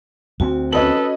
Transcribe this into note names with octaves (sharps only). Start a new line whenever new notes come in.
D2 G3 C4 F#4
C#4 A4 B4 D#5 F#7